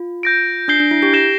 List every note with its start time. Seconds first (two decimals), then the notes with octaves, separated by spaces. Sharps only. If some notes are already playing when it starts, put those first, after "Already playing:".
Already playing: F4
0.23 G6 A#6 D7
0.68 D4 G6 C7 G7
0.80 D4
0.91 E4
1.02 G4
1.13 G4 G6 A#6 E7 G7